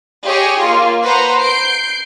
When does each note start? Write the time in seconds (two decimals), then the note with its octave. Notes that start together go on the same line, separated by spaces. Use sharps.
0.25 G4 G#4 C#5 D#5
0.62 A#3 F4
1.03 B4 C5 F#5 A#5
1.40 G6 C7 D7